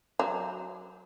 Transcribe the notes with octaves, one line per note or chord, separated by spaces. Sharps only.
F#3